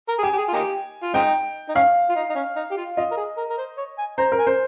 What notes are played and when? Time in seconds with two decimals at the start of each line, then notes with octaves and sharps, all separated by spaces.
0.08 A#4
0.19 G#4
0.23 G4 G#5
0.33 G4
0.38 G#4
0.48 F4
0.53 A#3 D#4 G4
1.03 F4
1.14 G#3 C4 D#4 G5
1.69 D#4
1.75 C#4 F5
2.09 F4
2.16 D#4
2.30 D#4
2.35 C#4
2.56 D#4
2.71 G4
2.77 F4
2.97 F4 D#5
3.11 A#4
3.17 G#4
3.37 A#4
3.50 A#4
3.58 C5
3.77 C#5
3.98 G#5
4.18 C5 A#5
4.32 A#4
4.39 G#5
4.47 C5